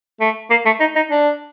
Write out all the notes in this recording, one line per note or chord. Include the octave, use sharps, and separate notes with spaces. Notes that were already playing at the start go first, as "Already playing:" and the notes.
A3
A#3
A3
D#4
D#4
D4